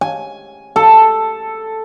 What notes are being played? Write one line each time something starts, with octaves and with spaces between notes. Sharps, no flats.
G#5
A4